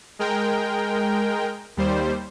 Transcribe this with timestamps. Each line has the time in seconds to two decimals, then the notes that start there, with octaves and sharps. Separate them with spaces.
0.19 G#3 A#4 G5
1.77 D#2 G3 C5